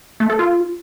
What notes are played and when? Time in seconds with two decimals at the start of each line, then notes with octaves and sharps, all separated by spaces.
0.20 A3
0.30 A4
0.39 F4